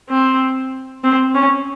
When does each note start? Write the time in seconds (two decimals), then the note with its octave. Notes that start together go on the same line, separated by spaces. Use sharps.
0.09 C4
1.04 C4
1.35 C#4